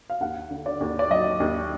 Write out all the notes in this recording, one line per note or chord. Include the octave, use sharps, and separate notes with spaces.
F5
D#2 F#5
D3
D5
D#2
D5
F#3 D#5
D#2